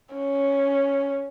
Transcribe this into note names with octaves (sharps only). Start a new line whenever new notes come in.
C#4